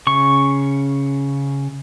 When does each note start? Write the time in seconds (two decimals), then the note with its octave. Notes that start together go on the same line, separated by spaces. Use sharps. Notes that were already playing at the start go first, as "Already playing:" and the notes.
0.07 C#3 C#6